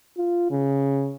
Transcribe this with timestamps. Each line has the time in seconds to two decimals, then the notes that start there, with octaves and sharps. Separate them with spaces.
0.17 F4
0.51 C#3